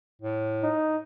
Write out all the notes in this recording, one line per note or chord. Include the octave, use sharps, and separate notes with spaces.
A2
D#4